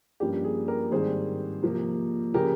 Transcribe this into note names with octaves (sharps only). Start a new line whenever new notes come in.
G2 F3 A#3 C#4 G4
G#4
G4 A#4
G#2 D#3 G3 C4 G#4 C5
C3 F3 A#3
C#3 F3 G4 A#4